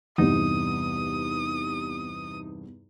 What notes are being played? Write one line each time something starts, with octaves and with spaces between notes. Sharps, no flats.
E2 G2 C3 B3 D#4 D#6